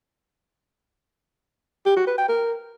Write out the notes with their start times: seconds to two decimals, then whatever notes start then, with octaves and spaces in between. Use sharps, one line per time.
1.86 G4
1.97 F#4
2.07 B4
2.18 G5
2.29 A#4